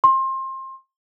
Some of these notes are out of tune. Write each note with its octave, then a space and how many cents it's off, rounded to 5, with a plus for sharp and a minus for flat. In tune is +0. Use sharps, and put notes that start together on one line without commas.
C6 +25